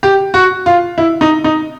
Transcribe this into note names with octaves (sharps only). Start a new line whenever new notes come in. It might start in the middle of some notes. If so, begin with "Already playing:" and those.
G4
F#4
F4
E4
D#4
D#4